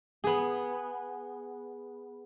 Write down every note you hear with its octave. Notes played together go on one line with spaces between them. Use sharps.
B3 G#4